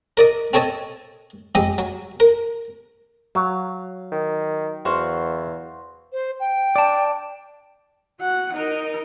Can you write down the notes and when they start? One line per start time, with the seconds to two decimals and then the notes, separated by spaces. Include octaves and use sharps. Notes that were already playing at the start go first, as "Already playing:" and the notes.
0.17 A#4 D5 D#5
0.53 C4 A4 C#5 D#5 A5
1.55 F2 G#3 G4 D#5
1.78 F#3
2.20 A#4
3.35 F#3 F5
4.12 D#3
4.85 E2 F#4 C5 F5
6.13 C5
6.40 G5
6.76 D5 A5
8.20 F#4 F#5
8.54 D#4 A#4